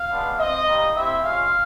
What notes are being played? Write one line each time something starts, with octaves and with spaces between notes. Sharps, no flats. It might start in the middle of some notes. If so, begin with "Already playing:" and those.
Already playing: F5
G#3 B3 D4
C4 F4 D#5
G3 A#3 D#4
C4 E4 G4 E5
G#3 C#4 F4 F5